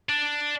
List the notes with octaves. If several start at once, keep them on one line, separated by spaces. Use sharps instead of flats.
D4